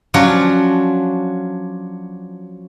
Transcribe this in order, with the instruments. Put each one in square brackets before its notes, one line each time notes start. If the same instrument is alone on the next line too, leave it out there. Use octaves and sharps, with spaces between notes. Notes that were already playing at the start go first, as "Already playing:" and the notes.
[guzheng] F3 F#3 C#4 D4 F#4